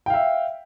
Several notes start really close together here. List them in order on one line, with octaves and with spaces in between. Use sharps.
G5 F5 E5